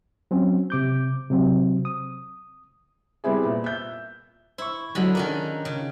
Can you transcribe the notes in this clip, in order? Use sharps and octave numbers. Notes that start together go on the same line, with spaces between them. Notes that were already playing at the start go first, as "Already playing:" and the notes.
F#3 C4 C#4
C3 D6 G6
C3 F#3 C4
D#6
G3 B3 C4 E4 G#4
A#2
E5 G6
E4 C5 C#6
D3 E3 F#3 G#3 B5
D#3 C#4 D4 F4 A#4
C#3